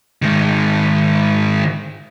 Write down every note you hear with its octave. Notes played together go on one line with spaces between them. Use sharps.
G#2 D#3